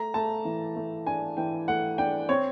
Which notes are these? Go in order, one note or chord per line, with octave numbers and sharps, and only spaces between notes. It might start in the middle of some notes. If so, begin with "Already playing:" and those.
Already playing: A3 A#5
A3 A5
E3
A3
D4 G#5
E3 G5
A3 F#5
D4 G5
C4 C#5